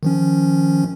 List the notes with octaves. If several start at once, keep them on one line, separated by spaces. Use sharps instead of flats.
D#3 F3 C#4